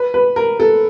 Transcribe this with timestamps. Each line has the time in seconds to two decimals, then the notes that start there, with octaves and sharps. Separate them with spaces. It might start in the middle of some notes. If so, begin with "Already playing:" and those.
Already playing: B4
0.14 B4
0.36 A#4
0.60 A4